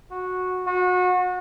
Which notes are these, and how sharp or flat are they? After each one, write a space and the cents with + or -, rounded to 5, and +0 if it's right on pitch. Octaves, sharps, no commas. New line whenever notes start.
F#4 -10
F#4 -30